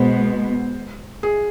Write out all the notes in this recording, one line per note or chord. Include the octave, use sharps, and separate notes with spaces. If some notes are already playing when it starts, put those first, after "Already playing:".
Already playing: B2 G#3 B3 C5
G#4